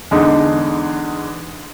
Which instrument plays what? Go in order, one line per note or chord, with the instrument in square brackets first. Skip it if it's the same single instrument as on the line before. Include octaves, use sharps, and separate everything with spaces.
[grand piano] E2 D3 G#3 D#4